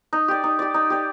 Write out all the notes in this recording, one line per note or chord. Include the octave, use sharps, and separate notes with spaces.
D#4
G4 D5
D#4
G4 D5
D#4
G4 D5